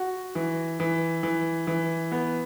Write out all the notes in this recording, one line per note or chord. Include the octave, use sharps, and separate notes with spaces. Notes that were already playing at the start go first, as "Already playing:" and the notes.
Already playing: F#4
E3
E3
E3
E3
B3